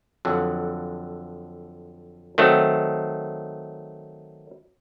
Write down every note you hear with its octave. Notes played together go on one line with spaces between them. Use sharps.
F2 D3 F#3
D#3 F#3 A3 C4